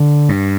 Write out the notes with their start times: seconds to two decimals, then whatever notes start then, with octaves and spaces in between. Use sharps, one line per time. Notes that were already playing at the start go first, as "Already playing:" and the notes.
Already playing: D3
0.29 G2